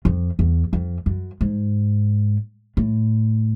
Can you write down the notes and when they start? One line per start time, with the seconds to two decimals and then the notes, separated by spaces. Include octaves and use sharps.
0.05 F2
0.39 E2
0.73 F2
1.06 F#2
1.41 G#2
2.77 A2